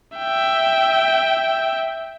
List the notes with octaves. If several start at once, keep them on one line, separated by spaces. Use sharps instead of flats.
E5 G5